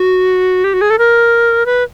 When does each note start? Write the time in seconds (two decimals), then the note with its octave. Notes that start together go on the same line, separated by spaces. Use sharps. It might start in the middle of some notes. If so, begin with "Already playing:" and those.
Already playing: F#4
0.64 G4
0.74 F#4
0.81 G#4
0.90 A4
0.98 A#4
1.66 B4